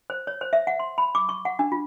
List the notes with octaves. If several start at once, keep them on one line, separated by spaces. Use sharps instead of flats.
C5
C#5
C5
E5
F#5
C6
B5
D6
C#6
F#5
D4
F4